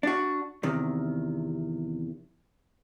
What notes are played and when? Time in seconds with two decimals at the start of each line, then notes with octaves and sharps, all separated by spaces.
0.03 D4 F#4
0.63 E2 C3 D#3